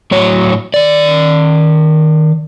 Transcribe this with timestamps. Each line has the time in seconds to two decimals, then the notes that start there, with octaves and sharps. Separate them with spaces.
0.11 A2 F#3 C#5
0.74 D#3 D5